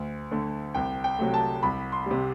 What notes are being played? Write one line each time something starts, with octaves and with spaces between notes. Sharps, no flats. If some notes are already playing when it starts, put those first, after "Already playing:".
Already playing: D2
D3 A3
C2 G5
G5
C3 F#3 A3
A5
C2 B5
C6
C3 G3